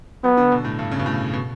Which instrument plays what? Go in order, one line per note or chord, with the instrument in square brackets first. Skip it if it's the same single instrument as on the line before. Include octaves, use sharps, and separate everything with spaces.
[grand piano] F#3 [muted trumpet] B3
[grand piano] D3
B2
A2
G2
C#3
B2
A2
B2